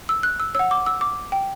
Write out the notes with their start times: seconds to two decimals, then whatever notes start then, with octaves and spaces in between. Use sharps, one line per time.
0.09 E6
0.23 F#6
0.40 E6
0.55 C#5 F#5 E6
0.71 D6
0.86 E6
1.01 D6
1.32 G5